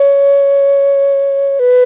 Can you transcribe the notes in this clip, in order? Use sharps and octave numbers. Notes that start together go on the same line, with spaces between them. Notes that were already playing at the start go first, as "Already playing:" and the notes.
Already playing: C#5
B4